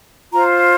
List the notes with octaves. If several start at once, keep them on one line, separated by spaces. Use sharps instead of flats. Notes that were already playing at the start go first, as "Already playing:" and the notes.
F4 C5 A#5